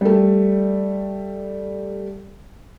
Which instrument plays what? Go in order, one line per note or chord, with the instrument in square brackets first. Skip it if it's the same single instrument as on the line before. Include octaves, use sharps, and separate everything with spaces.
[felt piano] G3 A3